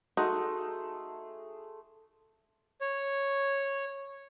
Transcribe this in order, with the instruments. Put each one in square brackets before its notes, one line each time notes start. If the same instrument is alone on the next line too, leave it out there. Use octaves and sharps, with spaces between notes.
[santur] A3 G#4 C6 [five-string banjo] D#4 [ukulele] F#4
[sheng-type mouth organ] C#5